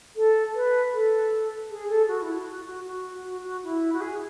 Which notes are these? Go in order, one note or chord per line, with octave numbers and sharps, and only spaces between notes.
A4
B4
A4
G#4
A4
F#4
E4
F#4
F#4
F#4
F#4
F#4
F#4
E4
F#4
G#4